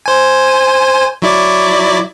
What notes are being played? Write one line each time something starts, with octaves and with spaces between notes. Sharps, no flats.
C5 G#5
F#3 E4 D5